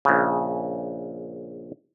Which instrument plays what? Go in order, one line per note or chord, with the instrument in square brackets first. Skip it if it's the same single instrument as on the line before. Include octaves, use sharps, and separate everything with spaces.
[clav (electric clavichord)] A#1 C#3